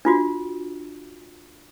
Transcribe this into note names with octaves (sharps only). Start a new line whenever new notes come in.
D4 F4 F#4